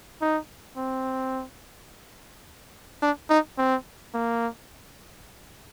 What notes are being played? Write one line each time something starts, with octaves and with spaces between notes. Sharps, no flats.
D#4
C4
D4
D#4
C4
A#3